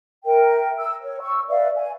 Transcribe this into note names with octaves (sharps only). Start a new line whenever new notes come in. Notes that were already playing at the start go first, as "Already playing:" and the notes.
A#4 E5 G5
E6
C#5
C#6 E6
B4 D5 E5 F5
G#5